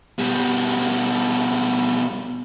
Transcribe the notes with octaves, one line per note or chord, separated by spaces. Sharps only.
B2 G3